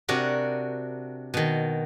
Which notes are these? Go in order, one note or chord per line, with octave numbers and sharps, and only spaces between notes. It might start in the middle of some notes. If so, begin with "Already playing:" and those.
C3 D4 F#4 A#4
B2 D#3